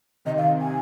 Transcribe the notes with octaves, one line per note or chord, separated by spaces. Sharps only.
C3 D#3 D#5
F5
G#5